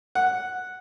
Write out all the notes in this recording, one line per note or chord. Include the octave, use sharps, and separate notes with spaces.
F#5